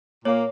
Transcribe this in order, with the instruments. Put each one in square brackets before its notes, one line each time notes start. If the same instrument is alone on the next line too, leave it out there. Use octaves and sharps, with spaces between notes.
[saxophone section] A#2 A#3 [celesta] C#5